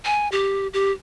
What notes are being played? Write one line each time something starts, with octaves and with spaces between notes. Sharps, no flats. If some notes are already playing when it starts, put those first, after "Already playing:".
G#5
G4
G4